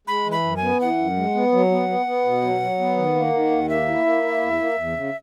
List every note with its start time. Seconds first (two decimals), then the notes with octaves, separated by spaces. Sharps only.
0.07 G#3 B5
0.26 E3
0.32 B5
0.44 F#2
0.57 G#5
0.62 B3
0.80 E3 F#5
0.98 F#2
1.16 G#3
1.35 B3
1.52 F#3
1.71 B3
1.89 B3
2.06 B3
2.25 B2
2.42 F#3
2.61 F#3
2.79 B3
2.97 D#3
3.15 A#3
3.33 D#3
3.51 D#2
3.69 A#3 E5
3.88 E4
4.05 A#3
4.23 E4
4.41 E2
4.59 A#3
4.77 E2
4.95 C#3